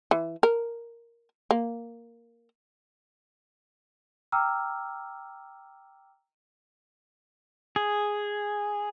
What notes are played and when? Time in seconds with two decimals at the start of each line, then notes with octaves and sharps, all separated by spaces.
0.11 E3
0.43 A#4
1.51 A#3
4.32 G5 A#5 D6 E6 F6
7.76 G#4